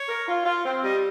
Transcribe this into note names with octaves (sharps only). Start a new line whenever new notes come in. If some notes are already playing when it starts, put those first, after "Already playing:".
Already playing: C#5
A#4
F4
F4
C4
G3 D#5